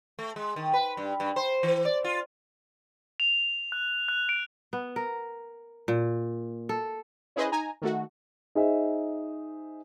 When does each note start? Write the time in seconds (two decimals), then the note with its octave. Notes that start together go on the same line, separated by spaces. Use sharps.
0.19 A3
0.36 G#3
0.56 D#3
0.74 B4
0.97 G2
1.20 G2
1.36 C5
1.63 E3
1.85 D5
2.04 F4
3.20 F7
3.72 F#6
4.08 F#6
4.29 D7
4.73 B3
4.96 A#4
5.88 A#2
6.69 A4
7.36 C#4 E4 G#4 B4 C5 D#5
7.52 D#4 G#5 A#5
7.82 D#3 A3 F#4
8.55 D#4 G#4 C5 D#5 E5